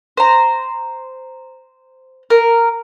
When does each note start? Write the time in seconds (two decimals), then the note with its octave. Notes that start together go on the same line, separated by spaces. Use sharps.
0.17 C5 A#5
2.30 A#4